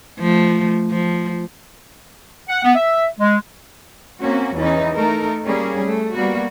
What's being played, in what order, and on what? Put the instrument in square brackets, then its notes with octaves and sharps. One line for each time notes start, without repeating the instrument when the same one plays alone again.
[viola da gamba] F3 A3
F3
[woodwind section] F#5
B3
E5
G#3
[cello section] A#3 C4 C#4 F#4
E2 E3 C#4 D#4
A3 D#4 A4 A#4
G3 A#3 C#4 G#4
A3
G3 A#3 B3 F#4